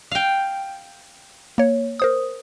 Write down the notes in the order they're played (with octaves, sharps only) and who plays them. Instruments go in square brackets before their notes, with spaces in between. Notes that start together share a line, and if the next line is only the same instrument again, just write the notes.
[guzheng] F5 G5
[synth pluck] A#3 C#5
A#4 C5 D#6